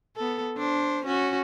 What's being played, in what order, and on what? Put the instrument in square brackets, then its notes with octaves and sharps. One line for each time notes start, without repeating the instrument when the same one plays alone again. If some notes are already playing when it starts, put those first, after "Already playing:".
[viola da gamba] B3 A4
D4 C5
C#4 F#4